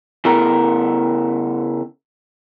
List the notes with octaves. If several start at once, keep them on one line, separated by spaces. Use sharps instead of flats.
C#3 B3 E4 A4 A#4